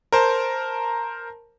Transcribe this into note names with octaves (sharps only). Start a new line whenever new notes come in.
A#4 C5 A5